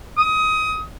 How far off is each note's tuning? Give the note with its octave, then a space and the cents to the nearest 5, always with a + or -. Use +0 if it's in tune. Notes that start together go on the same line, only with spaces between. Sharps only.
D#6 +20